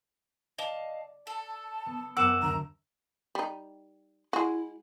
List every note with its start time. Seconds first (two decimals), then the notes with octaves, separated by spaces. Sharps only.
0.58 D5 D#5 F5 A5
1.27 A4 A5
1.86 B3
2.17 F#2 B3 C4 A#4 F#5 D6 E6 E7
2.42 D2 D3 A#5
3.35 G3 D#4
4.33 G#3 E4 F#4